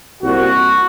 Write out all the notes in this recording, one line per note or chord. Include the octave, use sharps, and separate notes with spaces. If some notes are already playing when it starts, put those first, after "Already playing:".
C2 A#2 F#4